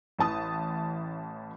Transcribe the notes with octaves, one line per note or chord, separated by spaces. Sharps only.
A1 E3 A5 D#6